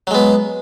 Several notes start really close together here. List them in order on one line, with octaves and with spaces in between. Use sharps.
F#3 G#3 B3